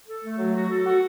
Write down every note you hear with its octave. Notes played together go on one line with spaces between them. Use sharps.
A4
A3
F#3
F#4
A4
F#4